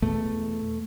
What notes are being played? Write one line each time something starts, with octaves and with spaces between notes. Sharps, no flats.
E2 B2 A3